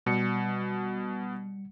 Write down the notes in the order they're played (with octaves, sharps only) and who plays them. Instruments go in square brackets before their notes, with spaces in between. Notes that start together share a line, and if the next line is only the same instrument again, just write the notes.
[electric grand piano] B2 [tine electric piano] G3 C#7